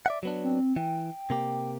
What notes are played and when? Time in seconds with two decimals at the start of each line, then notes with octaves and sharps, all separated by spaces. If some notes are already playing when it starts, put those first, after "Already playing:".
0.06 D5 E5 F#5
0.23 F#3 B3 D4
0.43 C4
0.76 E3 G5
1.30 C3 A#3 G4